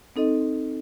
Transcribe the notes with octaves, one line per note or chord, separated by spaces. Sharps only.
C4 D#4 A4 D#5